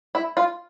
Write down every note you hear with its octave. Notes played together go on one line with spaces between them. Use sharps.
E4
F4